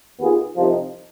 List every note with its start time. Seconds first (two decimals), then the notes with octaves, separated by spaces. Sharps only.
0.20 D#2 D#3 B3 F4 G#4
0.57 C2 C3 F3 C4 D#4